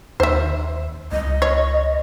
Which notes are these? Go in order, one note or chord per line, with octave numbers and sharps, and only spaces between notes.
D#2 C5 E5
C#2 D#5
C#5